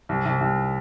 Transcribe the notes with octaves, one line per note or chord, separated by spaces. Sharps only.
C2
C2
C2